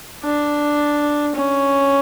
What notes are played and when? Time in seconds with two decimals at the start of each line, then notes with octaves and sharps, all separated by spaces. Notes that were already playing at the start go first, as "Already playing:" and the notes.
0.24 D4
1.36 C#4